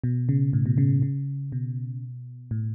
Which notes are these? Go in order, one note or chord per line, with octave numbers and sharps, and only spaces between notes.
B2
C#3
A2
B2
C#3
C#3
B2
A2